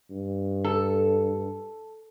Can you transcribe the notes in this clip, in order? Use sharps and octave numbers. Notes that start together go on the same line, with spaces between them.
G2
A4